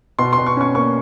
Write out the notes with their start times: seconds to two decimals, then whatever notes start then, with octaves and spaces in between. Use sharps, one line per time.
0.19 B2 C6
0.33 C6
0.38 B2
0.46 C#6
0.57 C#4 C#6
0.75 A#3 C#6